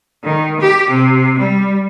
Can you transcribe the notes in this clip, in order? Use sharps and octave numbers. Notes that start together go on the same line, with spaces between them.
D#3
G4
C3
G3